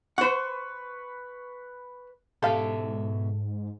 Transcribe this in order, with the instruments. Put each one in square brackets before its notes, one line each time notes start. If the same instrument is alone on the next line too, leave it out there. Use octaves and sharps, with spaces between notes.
[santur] B4 C#6 [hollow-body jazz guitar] C5 F#5
[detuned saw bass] G#2 [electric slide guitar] B2 E5 [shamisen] G4 F5 [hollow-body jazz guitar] A4